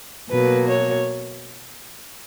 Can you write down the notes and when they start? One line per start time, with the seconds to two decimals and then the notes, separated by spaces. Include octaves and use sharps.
0.30 B2 F#3 A#3 B4
0.68 C#5